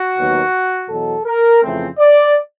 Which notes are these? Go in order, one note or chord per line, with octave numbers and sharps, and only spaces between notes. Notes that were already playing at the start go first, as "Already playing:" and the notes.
Already playing: F#4
D#2 D#3 F#3 B3
E2 B2 F#3 A4
A#4
F2 C#3 E3 A3 C4
D5